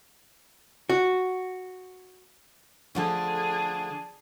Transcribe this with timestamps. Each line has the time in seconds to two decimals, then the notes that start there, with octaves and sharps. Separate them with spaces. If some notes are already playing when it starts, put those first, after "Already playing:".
0.89 F#4
2.95 D3 F3 A3 D4 G#4